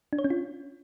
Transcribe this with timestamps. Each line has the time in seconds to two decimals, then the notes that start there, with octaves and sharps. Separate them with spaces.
0.13 D4
0.19 C#5
0.24 C#4
0.30 F4